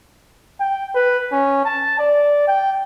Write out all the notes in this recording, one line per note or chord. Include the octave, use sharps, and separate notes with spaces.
G5
B4
C#4
A5
D5
G5